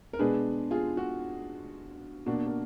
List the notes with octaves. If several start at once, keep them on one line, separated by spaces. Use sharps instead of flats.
A#4
B2 G#3 D4 G#4 B4
F4 G#4
F#4
B2 A#3 D4 F#4
A#4